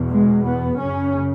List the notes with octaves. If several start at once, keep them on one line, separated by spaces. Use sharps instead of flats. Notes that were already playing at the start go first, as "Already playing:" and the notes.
Already playing: E2 B2
G#3
B3
F#2 C#3 C#4